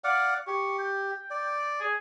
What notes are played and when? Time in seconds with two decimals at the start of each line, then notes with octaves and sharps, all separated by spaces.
0.04 D5 F5 F#5
0.47 G4 C#6
0.79 G5
1.30 D5
1.80 G#4